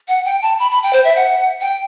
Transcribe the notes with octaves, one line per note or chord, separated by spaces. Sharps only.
F#5
G5
A5
B5
B5
G5
C5
E5
F#5
G5